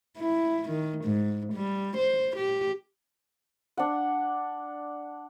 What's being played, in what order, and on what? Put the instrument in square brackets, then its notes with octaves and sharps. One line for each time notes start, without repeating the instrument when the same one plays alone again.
[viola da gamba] E4
D#3
G#2
G3
C5
G4
[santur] D4 F#5